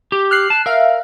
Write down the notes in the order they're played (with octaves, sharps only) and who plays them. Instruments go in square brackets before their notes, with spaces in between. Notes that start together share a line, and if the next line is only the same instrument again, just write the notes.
[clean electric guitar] G4
[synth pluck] F6 F#6 C7
[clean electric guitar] A5
[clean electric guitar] A#4 [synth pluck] E5 F5